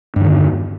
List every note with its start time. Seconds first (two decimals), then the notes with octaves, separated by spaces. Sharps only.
0.16 G2
0.20 D#3
0.24 D3
0.29 E2